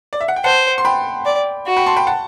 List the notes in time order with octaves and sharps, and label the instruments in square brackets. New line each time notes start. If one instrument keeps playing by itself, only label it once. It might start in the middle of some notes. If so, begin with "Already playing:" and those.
[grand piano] D5
E5
F#5
G5
[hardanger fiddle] C5 [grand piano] F#5 A5
[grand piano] C6
G5 B5
[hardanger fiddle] D5
F#4
[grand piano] G5 B5
A5 C6
G5 B5
F#5 A5